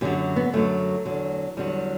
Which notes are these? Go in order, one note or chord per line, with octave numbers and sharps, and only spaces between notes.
F#2 D3 F#3 G4
B3
F#2 D3 F#3 A3
E2 D3 F#3
E2 D3 F#3 G3